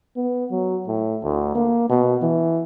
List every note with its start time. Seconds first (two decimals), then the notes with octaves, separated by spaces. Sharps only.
0.16 B3
0.51 F#3
0.88 A2
1.23 D2
1.55 A#3
1.90 B2
2.22 E3